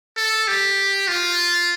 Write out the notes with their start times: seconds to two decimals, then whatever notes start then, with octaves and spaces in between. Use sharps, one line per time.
0.17 A4
0.48 G4
1.08 F4